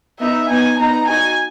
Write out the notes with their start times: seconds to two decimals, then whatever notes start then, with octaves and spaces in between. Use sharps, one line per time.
0.20 B3 D#4 E5
0.49 B3 D#4 G#5
0.79 B3 D#4 A#5
1.08 D#4 F#4 G#5